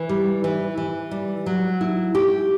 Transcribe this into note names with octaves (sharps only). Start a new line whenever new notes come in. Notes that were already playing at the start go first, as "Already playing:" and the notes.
Already playing: E3
G3
E3
E3
G3
F#3
E4
G4